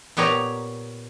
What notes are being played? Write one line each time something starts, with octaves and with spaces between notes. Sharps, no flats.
A#2 B3 G4 C#5 A#5